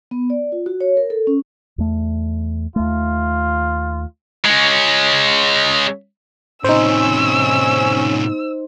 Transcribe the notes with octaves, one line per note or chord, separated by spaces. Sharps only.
B3
D5
F4
F#4
C#5
A#4
A4
C#4
E2 A3
D#2 A3 F4
G#3 C#4
A2 C3 C#4 D#4 C5 E6